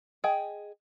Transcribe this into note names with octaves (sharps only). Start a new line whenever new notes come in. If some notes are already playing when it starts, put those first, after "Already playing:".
G#4 D#5 G5